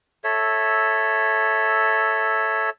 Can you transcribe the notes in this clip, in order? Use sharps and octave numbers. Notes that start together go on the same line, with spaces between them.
A4 C#5 E5